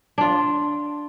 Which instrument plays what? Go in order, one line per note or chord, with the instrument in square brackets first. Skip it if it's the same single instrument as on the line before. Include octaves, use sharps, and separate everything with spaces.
[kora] D4 F4